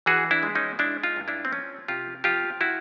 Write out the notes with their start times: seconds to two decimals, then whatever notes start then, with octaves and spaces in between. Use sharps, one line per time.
0.06 E3 F#4 G#4
0.31 D4 E4
0.43 G#3
0.55 C#4 D#4
0.79 G#3 D4 E4
1.03 D#4 F4
1.16 G2
1.28 D4 E4
1.45 C4
1.52 F3 C#4
1.88 C3 F4 G4
2.24 F3 F4 G4
2.61 E4 F#4